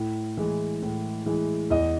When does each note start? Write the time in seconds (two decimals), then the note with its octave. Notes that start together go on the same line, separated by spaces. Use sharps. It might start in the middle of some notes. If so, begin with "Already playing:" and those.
Already playing: A2
0.37 E3 G#3
0.82 A2
1.26 E3 G#3
1.70 E2 D#5